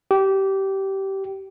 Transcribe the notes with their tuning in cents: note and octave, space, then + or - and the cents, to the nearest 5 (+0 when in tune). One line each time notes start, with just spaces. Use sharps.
G4 -20